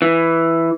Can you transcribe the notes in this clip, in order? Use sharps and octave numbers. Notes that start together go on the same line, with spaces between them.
E3